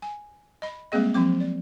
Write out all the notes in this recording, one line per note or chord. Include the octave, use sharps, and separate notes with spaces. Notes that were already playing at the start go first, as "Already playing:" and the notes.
G#5
D#5 B5
G3 G#3 A#3 C4 G#4 D#5
F3 F#3 C4 D6
D5